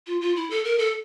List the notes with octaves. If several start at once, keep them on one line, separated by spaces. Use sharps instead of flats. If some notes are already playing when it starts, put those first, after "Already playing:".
F4
F4
E4
A4
A#4
A4